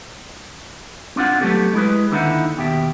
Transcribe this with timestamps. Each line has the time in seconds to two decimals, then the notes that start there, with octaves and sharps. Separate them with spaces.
1.16 C4 D4 E4 F4 F#5
1.41 F#3 A3 B3 G4 A4
1.74 G#3 E4 G#4 B4
2.11 D#2 D3 D#4 E4 F#5
2.57 D#2 B2 G4 E5